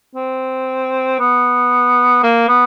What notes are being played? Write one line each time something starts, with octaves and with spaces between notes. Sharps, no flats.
C4
B3
A#3
B3